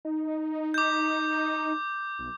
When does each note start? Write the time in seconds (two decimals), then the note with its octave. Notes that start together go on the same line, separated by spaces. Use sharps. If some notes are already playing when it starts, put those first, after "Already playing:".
0.05 D#4
0.74 D6 G6
2.19 B1